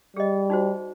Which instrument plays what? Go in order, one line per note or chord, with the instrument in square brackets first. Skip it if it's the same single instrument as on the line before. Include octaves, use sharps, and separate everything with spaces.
[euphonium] G3 [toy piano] G#4 D#5
[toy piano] D#4 F#4 C5